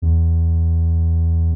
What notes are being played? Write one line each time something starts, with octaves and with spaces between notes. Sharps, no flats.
E2